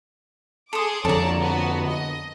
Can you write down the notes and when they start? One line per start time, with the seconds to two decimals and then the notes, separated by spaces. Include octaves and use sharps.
0.73 G#4 A4 C6 D6 D#6
1.05 F2 D3 A4 C#5 D5 A5 A#5
1.40 B3 F#4
1.86 D#5